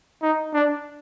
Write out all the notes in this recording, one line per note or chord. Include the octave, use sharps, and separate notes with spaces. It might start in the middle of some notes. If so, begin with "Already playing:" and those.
D#4
D4